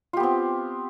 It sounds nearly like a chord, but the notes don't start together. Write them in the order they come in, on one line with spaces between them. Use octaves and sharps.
F4 G4 B3 C4